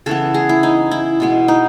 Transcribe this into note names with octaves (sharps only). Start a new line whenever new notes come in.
C#3 E3 B3 A4
G#4
E4
D#4
E4
B2 G#3 B3
D#4